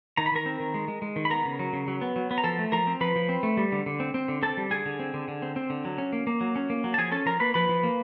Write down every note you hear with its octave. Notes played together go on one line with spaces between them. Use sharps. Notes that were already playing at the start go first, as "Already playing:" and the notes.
D#3 A#5
B5
D#3 A#4 A#5
C4
D#3
G#3
G#3
G#3
D#3
B5
B3 A#4 A#5
C#3
F#3
C#3
F#3
B3
F#3
B3
A#5
F3 A4 A5
A3
F3 A#4 A#5
C4
F3 B4 B5
F3
C4
A3
G3
D3
D3
C4
C4
D3
C4 A4 A5
G3
D3 G#4 G#5
D3
C4
D3
D3
C4
C4
D3
F#3
C#4
A#3
A#3
F#3
C#4
A#3
F#3
A5
F3 G#4 G#5
C#4 A4 A5
F3 A#4 A#5
A#3 B4 B5
F3 B4 B5
F3
A#3